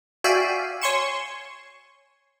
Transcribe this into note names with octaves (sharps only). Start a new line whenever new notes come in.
F#4 D5 E5 F5 G5 G#5
C#5 G#5 C6 C#6 C#7 E7